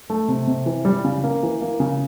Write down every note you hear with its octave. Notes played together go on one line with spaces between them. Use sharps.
A3
C3
C3
E3
G3
C#3
A#3
E3
A#3
C#3